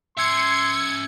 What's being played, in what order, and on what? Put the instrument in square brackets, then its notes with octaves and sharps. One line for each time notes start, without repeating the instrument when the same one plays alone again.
[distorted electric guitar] C#4 E5 [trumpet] C6 [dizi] E6 [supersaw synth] G#6 C#7